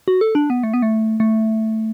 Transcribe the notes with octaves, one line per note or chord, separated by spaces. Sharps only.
F#4
A4
D4
B3
A3
B3
A3
A3